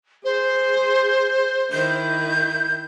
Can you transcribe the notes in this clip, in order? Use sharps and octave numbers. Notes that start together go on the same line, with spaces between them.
G#4 C5
D#3 E4 G6